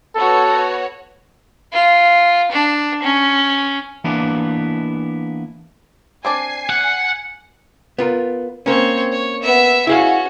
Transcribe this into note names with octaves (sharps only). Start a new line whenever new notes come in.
B3 F#4 A4 C#5
F4
D4
C#4
E3 A#3 B3 D4 E4 B4
C4 D4 D5 G#5 C7
F#5 C#7
B3 F4 A#4
A#3 C4 C#4 C#5
C#5
B3 E5
C#4 E4 F#4 G#4 F5